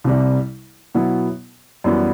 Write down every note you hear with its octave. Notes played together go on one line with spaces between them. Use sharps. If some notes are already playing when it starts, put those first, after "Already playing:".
C2 C3 G3
B2 F#3 B3 E4
F#2 E3 G3 B3